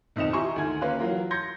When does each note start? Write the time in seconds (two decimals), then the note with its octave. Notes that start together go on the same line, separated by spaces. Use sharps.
0.16 B1 F2 D#3 D#5 C#7 E7
0.33 E4 G4 G#5 A#5 C6 C#6
0.56 D2 D#3 G#5 G#6
0.81 A#3 C#4 B4 F5 C6 F#6
0.99 E3 F#3 F4 A#4
1.31 C6 G6 G#6 A#6 C#7